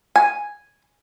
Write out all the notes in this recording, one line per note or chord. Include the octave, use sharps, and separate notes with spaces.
G#5